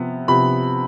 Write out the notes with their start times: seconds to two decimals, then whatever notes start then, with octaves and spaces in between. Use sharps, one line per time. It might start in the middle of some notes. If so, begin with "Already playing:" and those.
Already playing: C3 F3 B3
0.28 C3 F3 B3 B5